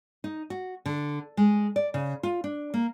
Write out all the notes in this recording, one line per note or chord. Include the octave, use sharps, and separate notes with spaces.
D#4
F#4
D3
G#3
D5
C#3
F4
D4
A#3